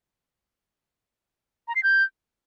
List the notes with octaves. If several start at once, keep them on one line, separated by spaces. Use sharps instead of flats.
A#5
C7
G6